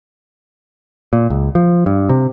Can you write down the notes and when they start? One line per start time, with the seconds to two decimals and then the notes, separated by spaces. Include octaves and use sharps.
1.13 A#2
1.30 C#2
1.55 F3
1.86 G2
2.09 C3